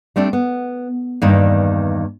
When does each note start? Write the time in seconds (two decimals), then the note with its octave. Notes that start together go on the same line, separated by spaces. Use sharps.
0.16 G3 A3 C4 D4
0.33 B3
1.22 E2 G2 D#3 A#3